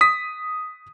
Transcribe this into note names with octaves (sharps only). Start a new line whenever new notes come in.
D#6 B6